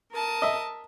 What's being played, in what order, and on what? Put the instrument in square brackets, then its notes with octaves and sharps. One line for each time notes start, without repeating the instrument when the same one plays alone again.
[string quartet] A#4 A5 D#6
[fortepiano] D#5 E5